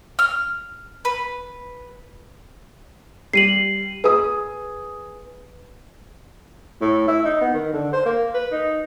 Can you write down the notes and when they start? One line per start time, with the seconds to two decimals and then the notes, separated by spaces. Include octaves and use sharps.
0.19 F6
1.05 B4
3.33 G3 C7 D#7 F#7
4.04 G#4 B4 D#6
6.81 A2
7.08 E4
7.25 D#4
7.41 B3
7.53 D#3
7.73 D3
7.93 C5
8.05 A#3
8.34 B4
8.52 D#4